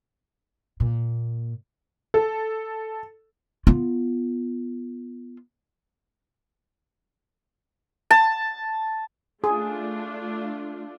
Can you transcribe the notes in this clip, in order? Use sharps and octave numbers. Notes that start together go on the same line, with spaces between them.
A#2
A4
B3 F4
A5
A3 D4 F4 G#4